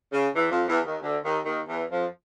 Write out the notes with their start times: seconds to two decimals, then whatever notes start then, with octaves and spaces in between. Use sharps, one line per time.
0.13 C#3
0.35 E2 E3
0.51 F2 F3
0.68 E2 E3
0.85 D#2 D#3
1.02 D2 D3
1.24 D#2 D#3
1.46 D#2 D#3
1.68 E2 E3
1.91 F2 F3